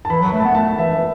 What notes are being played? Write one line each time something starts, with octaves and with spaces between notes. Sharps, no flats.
A5
E3 B5
F#3
B5
A3
B3 A5
A3 A5
E3 E5
E3